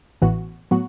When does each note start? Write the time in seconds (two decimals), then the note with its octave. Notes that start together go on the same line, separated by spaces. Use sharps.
0.22 A1 A2 E3 B3 F#4
0.71 A2 F#3 B3 F#4